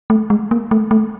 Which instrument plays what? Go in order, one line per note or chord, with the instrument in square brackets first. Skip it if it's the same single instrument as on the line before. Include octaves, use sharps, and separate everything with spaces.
[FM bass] A3
G#3
A#3
A3
A3